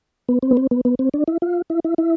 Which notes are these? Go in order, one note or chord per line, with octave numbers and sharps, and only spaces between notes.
B3
C4
B3
C4
B3
B3
C4
D4
E4
F4
E4
E4
E4